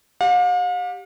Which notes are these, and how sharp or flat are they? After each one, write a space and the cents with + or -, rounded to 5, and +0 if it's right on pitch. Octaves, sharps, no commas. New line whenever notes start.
G4 +0 F5 +45